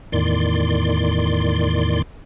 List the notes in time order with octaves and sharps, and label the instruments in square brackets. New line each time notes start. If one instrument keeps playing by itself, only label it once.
[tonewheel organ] E2 A2 D#3 D5 C6